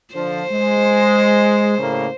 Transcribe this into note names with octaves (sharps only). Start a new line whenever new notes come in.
D3 F3 C5
G#3
A2 C#3 A#3